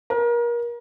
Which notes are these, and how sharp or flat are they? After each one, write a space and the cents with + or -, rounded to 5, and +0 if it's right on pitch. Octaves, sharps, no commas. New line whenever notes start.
A#4 +30